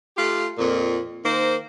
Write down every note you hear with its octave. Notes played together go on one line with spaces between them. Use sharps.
A3 F4 G4 F5
F2 A#2
D#3 A#3 C5